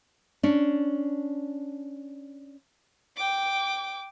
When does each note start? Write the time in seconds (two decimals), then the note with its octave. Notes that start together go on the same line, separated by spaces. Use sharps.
0.43 C#4 D4
3.17 G5 D6